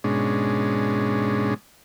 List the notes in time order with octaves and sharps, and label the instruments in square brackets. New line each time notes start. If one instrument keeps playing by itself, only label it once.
[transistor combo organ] G#2 B2 G#3 C#4 D4